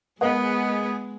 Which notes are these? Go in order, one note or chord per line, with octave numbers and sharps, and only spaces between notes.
G#3 B3 G#4 A#4 D#5 F#5